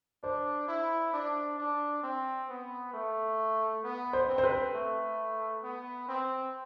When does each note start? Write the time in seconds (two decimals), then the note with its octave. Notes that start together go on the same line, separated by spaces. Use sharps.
0.23 D4 C5
0.68 E4
1.13 D4
1.58 D4
2.03 C4
2.49 B3
2.93 A3
3.83 B3
4.13 C5
4.28 C4
4.38 C5
4.44 B4
4.73 A3
5.63 B3
6.08 C4